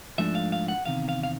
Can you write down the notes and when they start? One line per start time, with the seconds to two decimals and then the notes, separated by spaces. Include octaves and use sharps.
0.18 G#2 F3 A3 D4 E5
0.35 F5
0.52 F5
0.68 F#5
0.86 E2 C3 D#3 F5
1.09 F5
1.23 F5